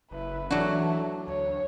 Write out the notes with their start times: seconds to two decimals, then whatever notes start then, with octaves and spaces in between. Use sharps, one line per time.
0.11 F#1 E4 B4
0.51 E3 F#3 A3 D4 F#4
1.27 D2 C#5